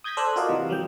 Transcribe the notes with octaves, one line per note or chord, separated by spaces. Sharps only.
D#6 G6 G#6 A#6 B6
A4 C5 D5 E6 F#6
F4 F#4 A#4 D5 D#5 F5
C3 E3
E3 F#3 G3 G5